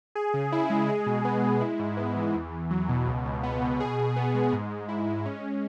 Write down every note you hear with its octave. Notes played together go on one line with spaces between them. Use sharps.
G#4
C#3
E4
G#3
G#4
B2
B3
G#3
E4
G#2
B3
E3
E2
E2
F#3
B2
C#2
C#2
B3
B2
G#4
B2
B3
G#3
G#2
G#2
E4
G#3
C#4